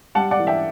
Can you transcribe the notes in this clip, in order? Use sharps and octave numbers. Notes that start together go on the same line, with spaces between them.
G3 F#5 A5
D5 F#5
E3
E5 G5